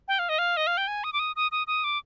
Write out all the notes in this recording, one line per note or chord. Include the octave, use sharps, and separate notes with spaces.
G5
F5
D#5
F5
D#5
F5
G5
G#5
D#6
D6
D#6
D#6
D#6
D#6
D6